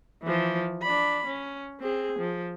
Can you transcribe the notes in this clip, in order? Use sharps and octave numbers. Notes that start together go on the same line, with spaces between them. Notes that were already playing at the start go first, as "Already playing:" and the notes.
E3 F3
D4 B5
C#4
C4 G#4
F3